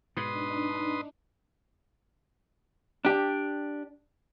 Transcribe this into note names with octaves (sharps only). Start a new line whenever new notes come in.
G#2 B2 D4 D#4 B4 C6 D#6
D4 G4